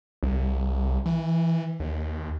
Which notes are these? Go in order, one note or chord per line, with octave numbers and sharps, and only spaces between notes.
C2
E3
D#2